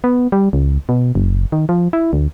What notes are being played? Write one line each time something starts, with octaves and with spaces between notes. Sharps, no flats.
B3
G3
C#2
B2
F#1
D#3
F3
E4
D2